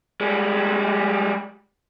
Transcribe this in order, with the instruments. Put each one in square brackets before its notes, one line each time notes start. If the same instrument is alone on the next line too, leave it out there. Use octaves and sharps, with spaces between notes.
[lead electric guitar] G3 G#3